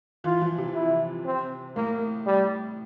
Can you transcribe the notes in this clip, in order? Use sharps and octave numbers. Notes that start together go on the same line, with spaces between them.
E3 F4
F3
C3
E4
C4
A2 A#3
G3